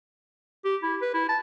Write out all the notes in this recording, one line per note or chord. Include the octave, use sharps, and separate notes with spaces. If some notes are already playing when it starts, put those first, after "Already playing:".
G4
E4
B4
E4
A5